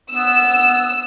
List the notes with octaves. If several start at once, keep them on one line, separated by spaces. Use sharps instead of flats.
B3 E6